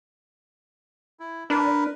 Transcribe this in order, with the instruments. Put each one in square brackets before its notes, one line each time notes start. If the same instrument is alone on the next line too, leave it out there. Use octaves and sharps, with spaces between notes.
[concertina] E4
[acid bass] D4 [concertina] A#4 B4